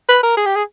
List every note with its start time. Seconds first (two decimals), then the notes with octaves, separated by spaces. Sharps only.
0.09 B4
0.23 A#4
0.37 G#4
0.46 G4
0.55 G#4